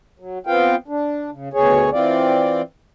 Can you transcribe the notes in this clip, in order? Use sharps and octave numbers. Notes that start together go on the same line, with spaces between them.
F#3
B3 C4 F4 F5 G5
D4
C#3
D2 B2 G#4 C#5
E3 C4 F4 D5